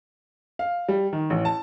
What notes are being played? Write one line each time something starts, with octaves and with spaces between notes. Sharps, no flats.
F5
G3
D#3
A1
A5